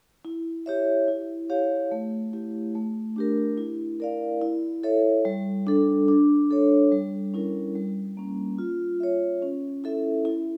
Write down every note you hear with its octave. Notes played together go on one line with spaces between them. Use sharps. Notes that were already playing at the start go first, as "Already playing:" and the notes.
E4
G4 C#5 E5
E4
G4 C#5 F5
A3
E4 G4
A3
D4 G4 A#4
E4
A#4 D5 F5
E4
A4 C#5 E5
G3
D4 A4
D4
A4 C#5
G3
C#4 E4 A#4
G3
A#3 C#4
F4
C#5 E5
C#4
E4 A4 E5
E4